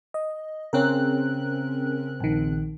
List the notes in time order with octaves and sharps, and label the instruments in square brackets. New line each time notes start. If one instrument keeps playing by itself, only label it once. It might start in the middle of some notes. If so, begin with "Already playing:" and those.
[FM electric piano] D#5
[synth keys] C#3 C4 F#6 [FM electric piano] C#4 A#4
[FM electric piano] A#1 D#3